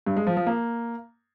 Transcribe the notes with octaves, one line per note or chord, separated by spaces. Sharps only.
G2
G#3
F3
F3
A#3